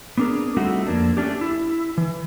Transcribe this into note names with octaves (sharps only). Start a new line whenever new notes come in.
B3 C4 D4 G#4 A#4
G3 A3 C4 D#4 F4 F#4
F2 A#3 D4
A3 C#4 D4 G4
E4
E3